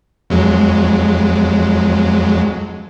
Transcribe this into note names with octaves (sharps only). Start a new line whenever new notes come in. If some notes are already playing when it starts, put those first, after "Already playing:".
F2 F#3 G#3